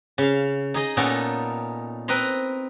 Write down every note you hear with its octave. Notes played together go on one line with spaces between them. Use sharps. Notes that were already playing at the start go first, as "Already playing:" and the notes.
C#3 F5
D#4 G#4 D#5
A#2 B3 C#4 D#4 A4 A#4
C4 A#4 B4 D#5 A#5 C6